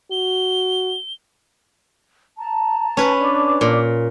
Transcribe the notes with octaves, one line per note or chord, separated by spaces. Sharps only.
F#4 G7
A5 A#5
C#4 B4
D4 D6
A#2